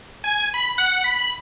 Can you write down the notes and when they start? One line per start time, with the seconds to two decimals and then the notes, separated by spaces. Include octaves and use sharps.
0.24 G#5
0.54 B5
0.78 F#5
1.04 B5